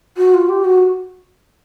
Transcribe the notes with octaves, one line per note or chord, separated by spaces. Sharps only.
F#4
F4
G4
F#4